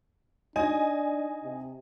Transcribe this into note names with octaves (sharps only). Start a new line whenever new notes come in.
D4 D#4 D#5 G#5
C3